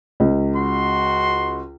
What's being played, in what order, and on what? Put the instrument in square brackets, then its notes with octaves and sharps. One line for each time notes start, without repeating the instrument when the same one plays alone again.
[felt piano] C#2
[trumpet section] F#4 C6